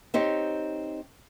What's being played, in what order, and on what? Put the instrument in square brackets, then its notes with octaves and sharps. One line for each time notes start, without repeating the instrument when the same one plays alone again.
[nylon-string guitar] C4 D#4 G4 C#5